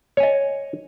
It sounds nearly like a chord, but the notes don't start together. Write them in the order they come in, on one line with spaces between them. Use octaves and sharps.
C#5 G#5 D#5